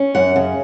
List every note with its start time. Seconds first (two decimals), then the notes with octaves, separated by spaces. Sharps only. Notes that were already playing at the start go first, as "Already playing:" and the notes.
Already playing: C#4
0.15 F#2 F#5
0.36 C#3